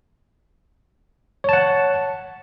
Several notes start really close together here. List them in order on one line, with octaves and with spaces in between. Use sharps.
C#5 A5 F#5